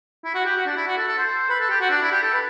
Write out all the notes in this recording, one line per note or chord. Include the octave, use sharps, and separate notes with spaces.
E4
F#4
G4
F#4
D4
E4
F#4
A4
A4
C5
B4
A4
G4
F#4
D4
E4
G4
A4
B4